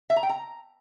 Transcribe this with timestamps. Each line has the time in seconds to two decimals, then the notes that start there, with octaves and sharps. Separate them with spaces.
0.10 E5
0.16 A#5
0.23 G5
0.29 A#5